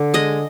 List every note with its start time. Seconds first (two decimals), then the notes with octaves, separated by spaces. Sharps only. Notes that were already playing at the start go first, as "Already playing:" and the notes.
Already playing: D3
0.14 G#3 D#5